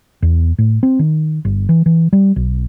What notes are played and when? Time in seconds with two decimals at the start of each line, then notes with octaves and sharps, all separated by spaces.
0.22 E2
0.58 A2
0.83 C4
0.99 D#3
1.45 G1
1.69 E3
1.86 E3
2.13 G3
2.36 B1